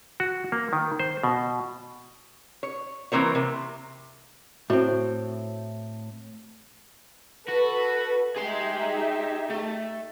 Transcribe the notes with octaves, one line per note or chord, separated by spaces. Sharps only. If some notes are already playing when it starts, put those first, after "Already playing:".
F#4
A#3
D#3
C5
B2
C#5
E3 A#3 C4 A#4 C#5
C3
A2 C4 F#4
F#4 A4 B4
D#4 G4 G#4 E5 C6
A3